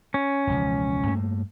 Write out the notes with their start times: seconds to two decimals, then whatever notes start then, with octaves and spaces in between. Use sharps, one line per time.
0.14 C#4
0.47 E1 C#2 F3
1.07 G2 A3 A#3